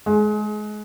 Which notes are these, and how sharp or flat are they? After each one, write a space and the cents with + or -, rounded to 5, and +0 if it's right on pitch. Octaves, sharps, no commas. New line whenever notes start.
G#3 +30